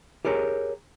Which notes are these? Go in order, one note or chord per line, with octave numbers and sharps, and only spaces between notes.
G4 G#4 A#4 C#5